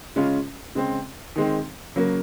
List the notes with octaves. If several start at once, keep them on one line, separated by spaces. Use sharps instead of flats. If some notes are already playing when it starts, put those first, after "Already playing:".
C#3 G#3 C#4 F4
C#3 G#3 C4
D#3 G#3 C4
C#3 F#3 A#3